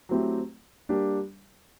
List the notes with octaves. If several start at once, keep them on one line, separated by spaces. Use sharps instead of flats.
F#3 A3 C4 E4 G4
G3 A#3 D4 G4